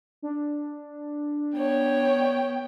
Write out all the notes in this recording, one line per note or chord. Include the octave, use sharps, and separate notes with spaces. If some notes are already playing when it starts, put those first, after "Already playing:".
D4
B3 C#5 G5